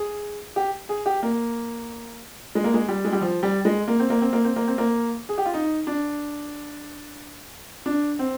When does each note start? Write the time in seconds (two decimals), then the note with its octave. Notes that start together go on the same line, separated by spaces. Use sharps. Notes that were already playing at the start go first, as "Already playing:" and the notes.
Already playing: G#4
0.56 G4
0.89 G#4
1.06 G4
1.23 A#3
2.55 G#3
2.64 A#3
2.74 G#3
2.88 G3
3.05 G#3
3.13 G3
3.21 F3
3.43 G3
3.65 G#3
3.88 A#3
3.99 C4
4.10 A#3
4.21 C4
4.33 A#3
4.45 C4
4.56 A#3
4.67 C4
4.78 A#3
5.29 G#4
5.38 G4
5.46 F4
5.54 D#4
5.87 D4
7.86 D4
8.19 C4